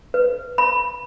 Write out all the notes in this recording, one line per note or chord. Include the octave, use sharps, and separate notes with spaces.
B4
B5